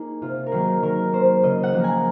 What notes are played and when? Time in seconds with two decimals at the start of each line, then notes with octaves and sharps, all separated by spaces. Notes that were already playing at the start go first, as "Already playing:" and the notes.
Already playing: A#3 D#4 G#4
0.22 C3 F4
0.46 A#4
0.52 D#3 F#3 A#3 G#4
0.82 D#3 A#4
1.13 A#3 C5
1.43 C#3 D#5
1.63 F#5
1.73 F3 A#3
1.80 G#5 A#5